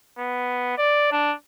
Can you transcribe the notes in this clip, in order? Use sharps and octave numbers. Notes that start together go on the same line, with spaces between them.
B3
D5
D4